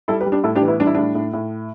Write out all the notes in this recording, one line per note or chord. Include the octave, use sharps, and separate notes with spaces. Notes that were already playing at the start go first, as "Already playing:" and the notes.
G3 E4 A4
G4 B4
G3
D4 G4
A2 E4 A4
D4 G4
E3
B3 E4
G3 D4
E4
A2 D4
A2
A2